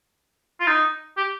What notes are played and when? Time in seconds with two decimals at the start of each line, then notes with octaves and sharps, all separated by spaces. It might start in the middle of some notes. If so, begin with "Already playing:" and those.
0.60 F4
0.67 D#4
1.17 G4